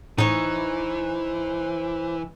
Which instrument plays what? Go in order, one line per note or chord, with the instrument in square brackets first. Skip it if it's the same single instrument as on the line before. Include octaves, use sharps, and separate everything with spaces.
[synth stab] A2 [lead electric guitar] E3 [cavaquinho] D#4 C#5 [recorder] C5